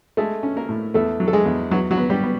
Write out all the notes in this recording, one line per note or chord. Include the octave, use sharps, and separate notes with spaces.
G#3 A3 A4
C#4
A#3 A#4
A2
E2 A3 A4
F#3
A4
G#3 G#4
E2
F#3 B3 F#4
F#3 F#4
B3
G3 G4
B3